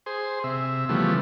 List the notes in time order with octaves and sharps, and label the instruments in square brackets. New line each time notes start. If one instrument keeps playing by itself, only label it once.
[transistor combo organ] G#4 C5
C3 E5
C#3 E3 F3 G3 A3 B3